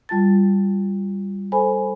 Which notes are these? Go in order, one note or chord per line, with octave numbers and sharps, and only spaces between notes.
G3 F4 A5 A6
A4 C5 G#5 B5